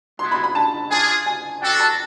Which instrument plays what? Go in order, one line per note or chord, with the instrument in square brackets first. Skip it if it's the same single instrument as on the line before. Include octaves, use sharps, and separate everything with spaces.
[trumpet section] G#3 B3 E4 [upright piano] C6
[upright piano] B5
B5
A5
[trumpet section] D4 F4 G#4 [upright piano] G#5
[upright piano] G#5
[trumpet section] D4 F#4 A4 [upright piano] G5
[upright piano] A5